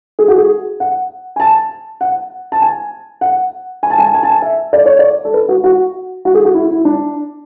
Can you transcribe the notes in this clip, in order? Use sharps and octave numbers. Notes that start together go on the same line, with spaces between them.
G#4
F#4
G#4
F#5
G#5
A5
F#5
A5
G#5
F#5
G#5
A5
G#5
A5
G#5
A5
G#5
E5
D5
C#5
D5
A4
B4
F#4
F#4
F#4
G#4
F#4
E4
E4
D4